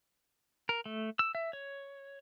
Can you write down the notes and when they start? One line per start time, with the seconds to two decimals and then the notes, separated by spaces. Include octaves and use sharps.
0.69 A#4
0.86 A3
1.19 E6
1.35 E5
1.53 C#5